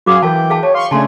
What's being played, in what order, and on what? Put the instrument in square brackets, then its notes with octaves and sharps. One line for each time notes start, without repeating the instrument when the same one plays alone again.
[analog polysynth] F#2 F#3 G#4 [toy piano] F#4 D6 [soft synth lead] F5
[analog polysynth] E3 [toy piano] A#4 F5 A5 [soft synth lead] G5
[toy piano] G#4 F5 A5
[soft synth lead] C#5 [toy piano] A5
[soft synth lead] F5 [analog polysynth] C6 C#6
[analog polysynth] C#3 A3 D4 [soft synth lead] G#5 [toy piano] A5 C6